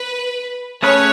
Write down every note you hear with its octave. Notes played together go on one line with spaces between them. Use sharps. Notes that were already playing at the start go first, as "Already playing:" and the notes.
Already playing: B4
A3 C#4 G#4 B4 C#5